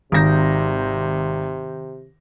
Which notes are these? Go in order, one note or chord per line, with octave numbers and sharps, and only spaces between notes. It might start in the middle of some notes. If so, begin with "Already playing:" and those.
G#1 C3 D#3 G6 A#6